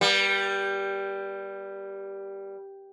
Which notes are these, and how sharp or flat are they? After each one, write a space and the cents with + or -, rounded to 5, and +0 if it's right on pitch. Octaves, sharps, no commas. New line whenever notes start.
G3 +0 B3 -45